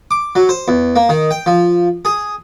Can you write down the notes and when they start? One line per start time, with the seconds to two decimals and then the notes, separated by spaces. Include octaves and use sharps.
0.11 D6
0.35 F#3
0.49 C5
0.68 E2
0.96 A#3
1.09 D#3
1.31 G5
1.46 F3
2.05 G#4